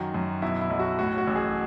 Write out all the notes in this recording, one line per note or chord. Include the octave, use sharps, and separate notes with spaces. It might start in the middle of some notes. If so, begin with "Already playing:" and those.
Already playing: F#2 D#3 F#4
F#2
B2 E4
E4
B1
F#4
A2 F#4
F#4
A1
G#4